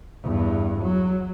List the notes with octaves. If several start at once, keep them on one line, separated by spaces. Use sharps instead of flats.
E2 G2
F#3